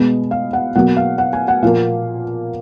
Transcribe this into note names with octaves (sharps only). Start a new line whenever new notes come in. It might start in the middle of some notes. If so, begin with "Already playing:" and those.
Already playing: B2 G#3 B3 D#5
F5
F#5
B2 F#3 A#3 F#5
F5
F#5
G#5
F#5
A#2 F3 A#3 F5